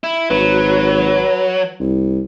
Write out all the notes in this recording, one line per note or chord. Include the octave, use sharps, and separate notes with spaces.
E4
G#1 F#3 B4
C2